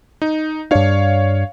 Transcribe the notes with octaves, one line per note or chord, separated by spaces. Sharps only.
D#4
G2 D4 C#5 F5